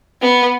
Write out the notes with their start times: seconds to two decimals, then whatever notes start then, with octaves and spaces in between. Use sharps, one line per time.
0.21 B3